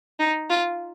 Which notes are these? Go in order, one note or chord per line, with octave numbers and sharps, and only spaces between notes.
D#4
F4